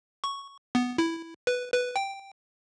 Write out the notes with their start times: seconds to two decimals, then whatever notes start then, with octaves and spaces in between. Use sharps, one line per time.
0.24 C#6
0.75 B3
0.98 E4
1.47 B4
1.73 B4
1.96 G5